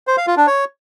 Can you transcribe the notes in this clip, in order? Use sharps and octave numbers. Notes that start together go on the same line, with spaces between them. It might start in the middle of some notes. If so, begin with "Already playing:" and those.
C5
F5
F4
D4
C#5